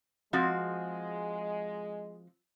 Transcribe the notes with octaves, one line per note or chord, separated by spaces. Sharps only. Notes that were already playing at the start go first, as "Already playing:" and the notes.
F3 G#3 C4 F#4